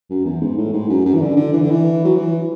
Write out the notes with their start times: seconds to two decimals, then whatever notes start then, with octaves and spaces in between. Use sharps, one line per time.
0.10 F#2
0.25 E2
0.41 G#2
0.57 A2
0.73 G#2
0.89 F#2
1.05 F#2
1.15 E3
1.21 D3
1.37 D3
1.53 E3
1.61 D3
1.71 E3
2.05 F#3
2.17 E3